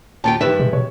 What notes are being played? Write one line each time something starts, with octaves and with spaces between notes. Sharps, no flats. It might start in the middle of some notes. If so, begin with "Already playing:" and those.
D#2 F4 G5 A5
G2 D#3 G3 B4 E5
B2 G#3
B2 C#5